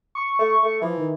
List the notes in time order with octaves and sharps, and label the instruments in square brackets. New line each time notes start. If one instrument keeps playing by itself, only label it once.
[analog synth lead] C#6
[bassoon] A3
A3
[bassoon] E3 [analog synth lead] F3
[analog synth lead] D#3